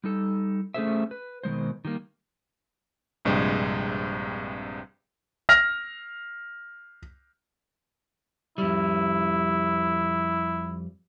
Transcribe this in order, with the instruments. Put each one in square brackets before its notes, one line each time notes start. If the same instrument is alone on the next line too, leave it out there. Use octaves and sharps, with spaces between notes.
[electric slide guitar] G3 D#4 A4
A3 C#4 G#4 A4 C5 E5
B4
B2 D#3 G#3 C5
D#3 G3 A#3
[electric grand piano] A#1 G2 C3 G#3
[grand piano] F6 A#6 F7
[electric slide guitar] F2 G3 [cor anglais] E4